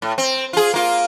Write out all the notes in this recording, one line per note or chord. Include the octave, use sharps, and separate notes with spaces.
A2
C4
F4 G#4
A#3 F4